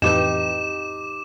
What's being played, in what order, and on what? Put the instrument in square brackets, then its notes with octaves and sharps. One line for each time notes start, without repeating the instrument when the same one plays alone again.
[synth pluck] F2 A2 E3 [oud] D#4 G4 B4 [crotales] D6 E7